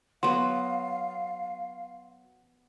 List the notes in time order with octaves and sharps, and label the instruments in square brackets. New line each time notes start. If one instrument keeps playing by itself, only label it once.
[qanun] F#3 B3 [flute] F5 [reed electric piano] F#5 [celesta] C6